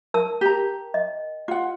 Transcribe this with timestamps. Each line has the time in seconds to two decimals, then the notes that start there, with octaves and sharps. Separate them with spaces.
0.14 A#4 A5 E6
0.41 G4 A#5
0.94 D#5
1.48 F4 F#5